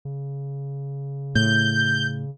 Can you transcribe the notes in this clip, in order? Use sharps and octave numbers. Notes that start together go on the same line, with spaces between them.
C#3
A2 G6